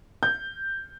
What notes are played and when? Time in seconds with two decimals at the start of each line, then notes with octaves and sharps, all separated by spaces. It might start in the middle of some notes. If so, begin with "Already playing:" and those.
0.23 G6